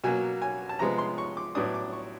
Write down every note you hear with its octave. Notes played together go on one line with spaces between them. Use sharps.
B2 F#3 A#3 G#5
G#5
A5
C3 F3 G#3 B3 A#5
C6
C#6
D6
A2 F#3 B3 D4 D#6
D6
C#6